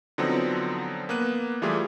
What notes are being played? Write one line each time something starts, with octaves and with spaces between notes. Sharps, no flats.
D3 F3 F#3 B3 C4 D#4
A#3 B3 F#6 D#7
E3 G3 A3 F4 G4 G#4